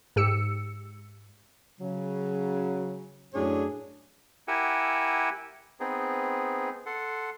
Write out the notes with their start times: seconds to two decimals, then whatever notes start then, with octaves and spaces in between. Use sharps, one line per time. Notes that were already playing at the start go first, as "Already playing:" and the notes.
0.16 G#2 G4 E6 C#7
1.81 C#3 F#3
3.34 F#2 A2 D4 G#4 C#5
4.48 E4 G4 A#4 F#5 G#5 E6
5.80 B3 C4 D#4 G#4
6.86 A4 F#5 C6